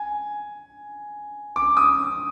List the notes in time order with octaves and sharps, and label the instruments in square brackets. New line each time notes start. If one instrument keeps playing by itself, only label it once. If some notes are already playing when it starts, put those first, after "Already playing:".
Already playing: [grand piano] G#5
D6
D#6